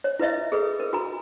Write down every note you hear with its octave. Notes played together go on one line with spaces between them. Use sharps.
C#5
E4 B4 D#5 E5
G#4 A4 B4
A#4 B4
F#4 G#5 A#5